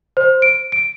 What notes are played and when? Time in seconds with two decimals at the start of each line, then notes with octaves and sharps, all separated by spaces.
0.17 C5
0.42 D7
0.72 D7